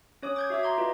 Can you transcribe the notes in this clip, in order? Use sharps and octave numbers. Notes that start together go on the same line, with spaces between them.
C#4 C#5 D6 D#6
D6 G6 G#6
F#4 E5 D6 E6
A#5 C6 D6 G#6
F4 B4 D#5